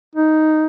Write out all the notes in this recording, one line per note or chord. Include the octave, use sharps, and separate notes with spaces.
D#4